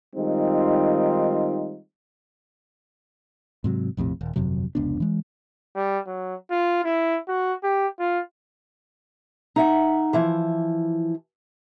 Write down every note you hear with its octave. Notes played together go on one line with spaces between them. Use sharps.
D#3 G3 G#3 C4 D#4 F4
G#2 C3 F#3
A#1 F2 A2 C3
D#1
G1 F2 C3 F#3
F1 C#2 B3 D4
E3 G#3
G3
F#3
F4
E4
F#4
G4
F4
D#4 E5 F#5
E3 F3 E4